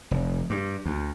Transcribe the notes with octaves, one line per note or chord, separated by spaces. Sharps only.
F1
G2
D2